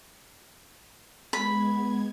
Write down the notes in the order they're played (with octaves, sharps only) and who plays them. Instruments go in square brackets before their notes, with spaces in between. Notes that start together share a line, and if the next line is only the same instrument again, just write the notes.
[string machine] G#3 B3 G#6 [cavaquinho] B5